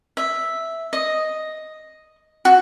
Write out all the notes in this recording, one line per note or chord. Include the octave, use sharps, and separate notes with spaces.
E5
D#5
F#4